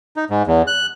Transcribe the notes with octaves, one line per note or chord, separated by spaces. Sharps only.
D#4
G#2
E2
F#6